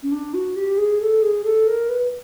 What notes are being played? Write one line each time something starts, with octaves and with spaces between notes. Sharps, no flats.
C#4
D4
F#4
G4
G#4
A4
G#4
A4
A#4
B4